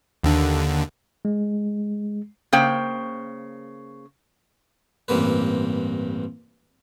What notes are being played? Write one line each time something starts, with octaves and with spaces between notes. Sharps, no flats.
D#2 D3
G#3
C#3 A#3 C5 G5
A1 G2 C3 A#3 B4